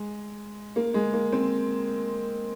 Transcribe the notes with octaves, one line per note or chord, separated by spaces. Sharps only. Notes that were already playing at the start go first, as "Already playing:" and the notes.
Already playing: G#3
A#3
G#3
A#3
C4